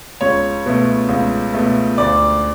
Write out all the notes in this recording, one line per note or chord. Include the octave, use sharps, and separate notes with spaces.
C#2 C#5
B2 A3
C#2
B2 A3
D2 D5